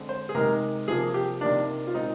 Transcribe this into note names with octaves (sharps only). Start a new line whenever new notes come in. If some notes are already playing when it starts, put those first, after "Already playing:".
Already playing: D3 G#3 C4
C5
G#4
C3 D#3 G#3 A#4
C3 F3 A#3 G#4
G4
C3 D#3 A#3 D4
F4
A#2 G#3 C4 D#4